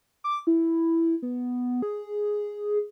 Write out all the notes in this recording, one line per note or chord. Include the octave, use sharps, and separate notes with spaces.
D6
E4
B3
G#4